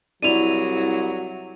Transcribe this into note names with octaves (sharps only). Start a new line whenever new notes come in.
C2 F#3 E4 D5 D#7 F7